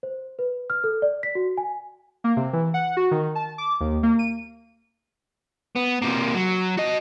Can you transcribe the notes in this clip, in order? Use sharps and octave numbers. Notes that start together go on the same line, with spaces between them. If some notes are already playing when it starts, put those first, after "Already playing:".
C5
B4
F6
A4
D5
B6
F#4
G#5
A#3
C3
E3
F#5
F#4
D#3
A5
D6
D#2
A#3
D#7
B3
C3 A#3
F#3
F#4 D#5